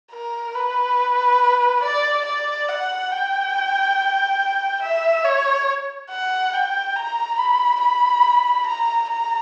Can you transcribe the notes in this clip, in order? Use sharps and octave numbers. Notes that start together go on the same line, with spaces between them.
A#4
B4
D5
D5
F#5
G5
E5
C#5
F#5
G5
A#5
B5
B5
A#5
A#5